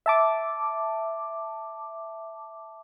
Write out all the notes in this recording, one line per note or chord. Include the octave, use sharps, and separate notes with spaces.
E5 A5 D6